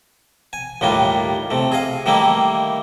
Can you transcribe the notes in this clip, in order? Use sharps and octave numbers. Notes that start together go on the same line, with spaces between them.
G#5
D#2 A2 G3 D#4 F4
C3 A3
G#4 D#5 F5
D#3 G3 A3 A#3 D#4 E4